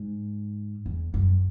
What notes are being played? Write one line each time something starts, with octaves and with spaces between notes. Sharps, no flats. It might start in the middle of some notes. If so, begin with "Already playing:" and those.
Already playing: G#2
E2
F#2